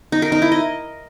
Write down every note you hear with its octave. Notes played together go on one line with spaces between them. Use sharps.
D#4
A#4
D#4
E4
D#5